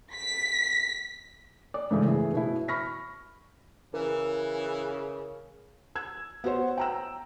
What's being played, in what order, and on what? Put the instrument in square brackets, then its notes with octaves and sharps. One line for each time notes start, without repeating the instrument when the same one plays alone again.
[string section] B6
[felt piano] D5
G#2 C#3 E3 A3
E3 A3 G#4
B2 E4
B5 C#6 F6 A#6 B6
[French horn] C#3 [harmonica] E3 [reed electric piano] A#4
[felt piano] E6 G#6
B3 F#4 C5 C#5
G5 A#5 E6